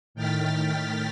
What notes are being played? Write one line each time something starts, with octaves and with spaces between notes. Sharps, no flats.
A2 D#3 G5 F6 A6 B6